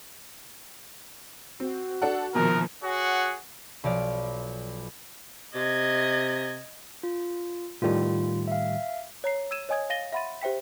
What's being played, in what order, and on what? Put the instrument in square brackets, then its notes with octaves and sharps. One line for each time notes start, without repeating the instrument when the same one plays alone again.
[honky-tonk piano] C4 [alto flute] F#4
[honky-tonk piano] D4 A4 F#5
[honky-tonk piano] A#1 B2 [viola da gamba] D#3 F3 [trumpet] A#4
[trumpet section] F#4 G#4 C#5 F#5
[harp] B1 F3 D5 F6
[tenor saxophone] C3 [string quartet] D#5 G#6
[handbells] F4
[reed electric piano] A2 D#3 G3 [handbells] F4
[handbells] E5 F5
[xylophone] C#5 A#5 C7
E6 G#6 D#7 E7
C#5 D#5 G#5 D#6 G#6
F5 A6 A#6 D#7 G7
E5 F#5 B5 C6 A6 D#7
G4 C5 E5 G5 B6